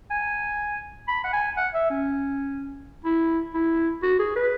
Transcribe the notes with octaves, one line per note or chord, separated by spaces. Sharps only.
G#5
B5
F#5
G#5
F#5
E5
C#4
E4
E4
F#4
G#4
B4